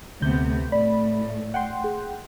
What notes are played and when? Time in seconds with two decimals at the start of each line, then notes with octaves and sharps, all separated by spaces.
0.22 D2 C3 A3 B3 G6
0.72 A2 A3 D5 B5
1.54 F#5 G5 C6
1.84 G#4